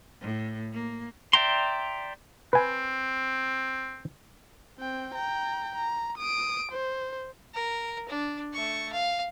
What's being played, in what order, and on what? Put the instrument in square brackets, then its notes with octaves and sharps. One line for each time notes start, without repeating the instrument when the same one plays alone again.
[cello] A2
A#3
[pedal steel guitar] D5 E5 G5 A#5 C6
[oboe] C4 [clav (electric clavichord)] B4 G#5
[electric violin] C4 G5
G5 A#5
A#5
D#6 D7
C5
[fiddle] A#4
D4
A3 C#6
F5